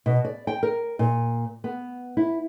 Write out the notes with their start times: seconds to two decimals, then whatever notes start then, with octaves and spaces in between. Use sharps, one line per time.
0.06 B2
0.25 D5
0.47 G5
0.63 A#4
0.99 A#2
1.64 B3
2.17 E4